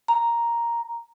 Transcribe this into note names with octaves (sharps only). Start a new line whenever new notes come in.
A#5